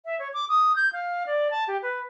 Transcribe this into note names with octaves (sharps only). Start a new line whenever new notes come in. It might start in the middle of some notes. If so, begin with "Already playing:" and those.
E5
C#5
D6
D#6
G6
F5
D5
A5
G4
B4